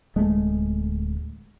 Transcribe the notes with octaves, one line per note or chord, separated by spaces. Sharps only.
D1 G#3 A3